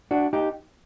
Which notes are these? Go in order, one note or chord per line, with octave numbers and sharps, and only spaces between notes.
D4 F#4
D#4 G4